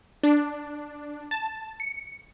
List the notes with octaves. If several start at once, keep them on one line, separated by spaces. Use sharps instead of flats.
D4
A5
C#7